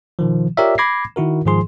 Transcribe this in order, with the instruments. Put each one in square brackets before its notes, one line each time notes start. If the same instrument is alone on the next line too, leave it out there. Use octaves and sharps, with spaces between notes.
[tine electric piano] B2 D#3 F3
F4 G4 A#4 C#5 D5 E5
B5 D6 G#6 A#6 C7
D#3 E4 F#4 A#4
G#2 D#3 F3 G#4 C6